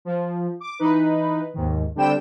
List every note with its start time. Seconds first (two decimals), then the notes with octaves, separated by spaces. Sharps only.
0.05 F3
0.60 D6
0.79 E3 D#4 B4
1.54 D#2 G#2 D#3
1.96 D3 G3 C4 D4 G5 E7